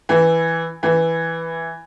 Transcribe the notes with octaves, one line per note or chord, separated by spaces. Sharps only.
E3
E3